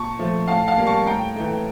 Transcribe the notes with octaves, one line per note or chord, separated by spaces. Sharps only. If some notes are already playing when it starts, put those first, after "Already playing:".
Already playing: A#2 A5 C#6
F3 A3
A2 F5 A5
F5 A5
G3 A#3
A5 C#6
A2 G5 A#5
E3 A3